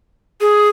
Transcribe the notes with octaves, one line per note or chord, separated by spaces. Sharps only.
G#4